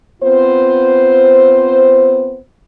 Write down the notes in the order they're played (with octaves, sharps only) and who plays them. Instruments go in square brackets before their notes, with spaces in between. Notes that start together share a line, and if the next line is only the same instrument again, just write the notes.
[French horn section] B3 C4 F4 C5